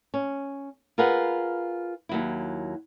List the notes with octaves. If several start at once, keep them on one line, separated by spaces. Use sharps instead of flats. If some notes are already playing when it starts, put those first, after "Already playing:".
C#4
F4 G#4 A#4 B4 F#5
D#2 F#3 E4